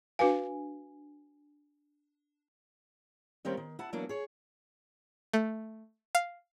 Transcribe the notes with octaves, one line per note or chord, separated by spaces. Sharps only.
D4 F#4 B4 F5 G#5
D#3 G3 A#3 C4 C#4
D#3
E4 F#5 A5
E3 F#3 A#3 B3 D4 F#4
G#4 C#5
A3
F5